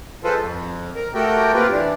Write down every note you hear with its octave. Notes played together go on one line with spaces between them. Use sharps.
F3 G#3 F4 A4 B4 C5
F2
A#4
A3 F#4 G4 A4 A#4 G5
A#3 C4 F4 G4 A#4 B4
E3 D4